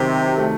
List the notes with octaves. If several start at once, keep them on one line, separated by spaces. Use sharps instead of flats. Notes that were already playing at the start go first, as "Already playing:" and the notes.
Already playing: C3 D#3 F#3
A3